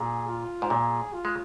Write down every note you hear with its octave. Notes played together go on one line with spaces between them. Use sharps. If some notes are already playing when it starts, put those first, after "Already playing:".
Already playing: A#2 G#4
F4
G#2
A#2 G#4
F4
G#3